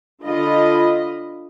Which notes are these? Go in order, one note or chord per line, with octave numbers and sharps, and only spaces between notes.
D3 F4 D#5 B5